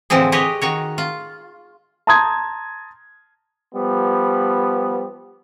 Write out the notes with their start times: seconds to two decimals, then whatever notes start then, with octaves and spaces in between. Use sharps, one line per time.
0.10 A2 D3 E3 F3 C4 G#4
0.32 G4 G#4 B4 C#5 D#5
0.61 D#3 F#4 C#5
0.98 F4
2.07 A5 A#5 C6 D#6 G6 G#6
3.75 F3 G3 B3